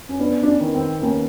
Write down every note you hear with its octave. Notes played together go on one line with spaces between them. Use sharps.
C#4
B3 D4
D4
C#4
D#3
C4
D#2 C#4